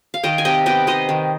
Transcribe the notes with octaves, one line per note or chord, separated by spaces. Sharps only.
F5
D#3 D#5 G5
G#5
C3 D#5 G5
B3 D#5 G5
D#4 C5 D#5
D#3